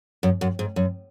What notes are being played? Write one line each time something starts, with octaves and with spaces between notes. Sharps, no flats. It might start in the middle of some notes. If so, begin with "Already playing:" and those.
F#2
F#2
G#2
F#2